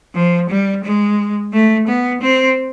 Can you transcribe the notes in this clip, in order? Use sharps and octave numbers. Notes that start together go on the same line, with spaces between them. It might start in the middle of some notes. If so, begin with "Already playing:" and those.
F3
G3
G#3
A3
B3
C4